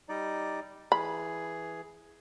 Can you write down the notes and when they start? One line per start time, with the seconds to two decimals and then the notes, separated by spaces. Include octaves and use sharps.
0.09 G3 D#4 D5
0.92 E3 G#4 B5